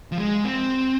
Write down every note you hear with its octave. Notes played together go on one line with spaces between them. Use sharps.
F3
G#3
C4